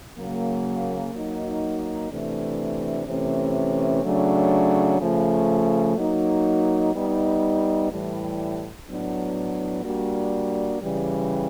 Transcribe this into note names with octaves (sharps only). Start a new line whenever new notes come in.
C#3 F#3 A#3
F#3 A#3 D#4 F#4
C3 E3 A3 D4
C3 E3 A3 C#4
C#3 F#3 A3 D4
C#3 F3 A3
F#3 A#3 D#4
G3 B3 D#4
A2 E3 G3
A2 F#3 B3 D4
G3 A#3 D4 F#4
C#3 E3 G3